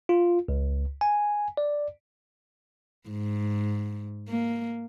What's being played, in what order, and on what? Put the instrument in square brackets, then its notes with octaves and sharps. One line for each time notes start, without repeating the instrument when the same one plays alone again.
[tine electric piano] F4
C#2
G#5
D5
[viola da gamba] G#2
A#3